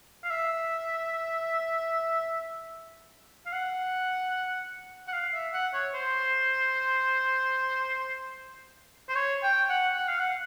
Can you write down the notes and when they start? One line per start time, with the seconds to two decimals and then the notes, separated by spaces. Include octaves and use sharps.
0.24 F5
0.30 E5
3.46 F5
3.52 F#5
5.08 F#5
5.13 F5
5.34 E5
5.53 F#5
5.74 C#5
5.94 C5
9.09 C5
9.15 C#5
9.43 G5
9.69 F#5
9.96 F#5
10.08 F5
10.19 F#5